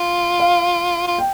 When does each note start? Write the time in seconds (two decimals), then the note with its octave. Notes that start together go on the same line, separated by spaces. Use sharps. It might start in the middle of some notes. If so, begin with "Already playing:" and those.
Already playing: F4
0.40 F5
1.07 F4
1.18 G5